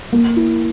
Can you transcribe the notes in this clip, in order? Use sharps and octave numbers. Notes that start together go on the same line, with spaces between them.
A#3
E4